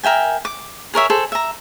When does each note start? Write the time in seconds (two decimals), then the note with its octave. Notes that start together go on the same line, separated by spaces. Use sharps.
0.03 A#4 E5 G5 G#5
0.45 D6
0.94 G#4 A#4 C#5 E5
1.10 G#4 A4 C5
1.32 E5 A#5